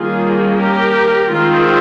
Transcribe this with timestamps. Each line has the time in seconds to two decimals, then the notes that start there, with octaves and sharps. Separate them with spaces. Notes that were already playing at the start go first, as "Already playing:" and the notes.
Already playing: D#3 G3 A#3 C#4 F4 G#4
0.59 G4 A#4
1.30 D#3 G#3 C4 F4